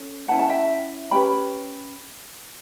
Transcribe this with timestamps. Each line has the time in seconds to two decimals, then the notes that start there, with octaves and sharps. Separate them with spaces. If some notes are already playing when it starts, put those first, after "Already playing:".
Already playing: C#4 A4
0.28 C#4 E4 B4 F#5 A5
0.39 A5
0.49 E5 G5
1.11 C#4 G4 B4 G5 B5